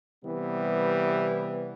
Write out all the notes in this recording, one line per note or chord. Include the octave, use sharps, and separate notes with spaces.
C3 E3 G3 B3